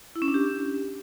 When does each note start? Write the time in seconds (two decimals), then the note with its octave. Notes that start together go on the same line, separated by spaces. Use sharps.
0.16 E4
0.22 C#4
0.28 D4
0.34 G4